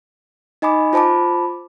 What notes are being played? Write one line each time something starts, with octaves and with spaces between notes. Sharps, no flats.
D#4 D#5 G#5 B5 D6
F4 C5 A5 B5 D6